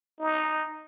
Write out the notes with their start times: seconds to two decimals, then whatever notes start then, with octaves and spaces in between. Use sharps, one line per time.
0.19 D#4